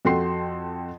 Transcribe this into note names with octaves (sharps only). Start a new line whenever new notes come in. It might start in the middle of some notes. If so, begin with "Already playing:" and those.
F2 F#4 A4 G5 C6 C7